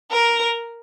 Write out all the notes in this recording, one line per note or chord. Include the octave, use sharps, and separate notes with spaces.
A#4